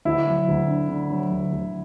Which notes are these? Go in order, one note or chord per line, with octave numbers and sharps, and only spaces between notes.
D2 E4
F#3
D2
D3
D3
F#3
D2
D2